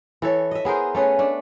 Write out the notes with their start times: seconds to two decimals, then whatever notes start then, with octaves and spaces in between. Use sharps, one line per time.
0.22 E3 A4 C#5
0.51 D#5 E5
0.65 B3 G#4 A#4 C5
0.95 A3 C#4 G#4 B4
1.19 A3 D4